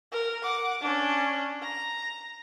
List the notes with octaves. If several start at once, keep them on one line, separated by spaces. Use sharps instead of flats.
A#4
F#5 D6
C#4 D4
A#5